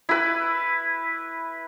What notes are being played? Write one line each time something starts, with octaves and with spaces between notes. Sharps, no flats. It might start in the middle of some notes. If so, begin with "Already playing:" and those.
E4 B4